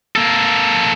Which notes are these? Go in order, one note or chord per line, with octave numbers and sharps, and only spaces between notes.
A#3 A4